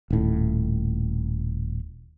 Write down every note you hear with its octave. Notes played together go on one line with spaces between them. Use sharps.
D#1 A2